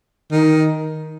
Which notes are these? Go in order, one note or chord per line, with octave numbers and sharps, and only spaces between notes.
D#3